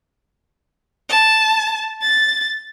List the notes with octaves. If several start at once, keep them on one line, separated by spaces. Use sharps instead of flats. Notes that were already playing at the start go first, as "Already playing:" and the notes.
A5
A6